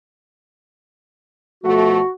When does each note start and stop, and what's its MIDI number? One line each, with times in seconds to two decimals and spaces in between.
1.64 2.00 47
1.64 2.00 53
1.64 2.00 57
1.64 2.10 66